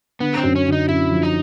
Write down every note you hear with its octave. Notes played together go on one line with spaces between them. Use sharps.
D3 B3
C4
F#2
C#4
D3
D#4
F#2 E4
F3
D#4